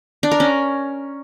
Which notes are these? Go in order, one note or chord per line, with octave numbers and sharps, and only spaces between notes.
D4
A#4
C#4